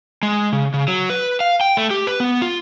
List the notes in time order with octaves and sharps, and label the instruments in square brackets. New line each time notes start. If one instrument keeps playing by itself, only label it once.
[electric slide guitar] G#3
C#3
C#3
F#3
B4
F5
G5
A3
G4
B4
B3
F4